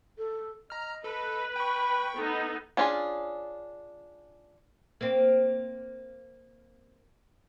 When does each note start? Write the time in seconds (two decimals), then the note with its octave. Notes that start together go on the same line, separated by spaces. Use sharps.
0.18 A4
0.70 D#5 A#5 F6
1.04 A4 B4
1.56 G5 B5 C#6
2.17 B3 D#4 A4
2.77 B3 C#4 D4 F4 G#4
5.01 A#3 C4